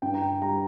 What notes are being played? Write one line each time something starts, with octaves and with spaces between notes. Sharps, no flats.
G2 G5
A#5
G5
G3 A#5